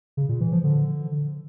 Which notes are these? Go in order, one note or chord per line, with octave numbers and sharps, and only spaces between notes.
C#3
A#2
E3
F3
D3